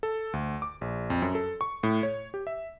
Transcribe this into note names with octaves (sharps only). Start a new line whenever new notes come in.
A4
D2
D6
A#1
F2
F#2
A4
C#6
A2
C#5
G4
E5